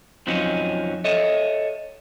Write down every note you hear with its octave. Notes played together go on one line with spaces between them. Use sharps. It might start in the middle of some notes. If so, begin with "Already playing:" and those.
F2 F3 F#3 C4 C#4 D#4
A4 C#5 D#5 E5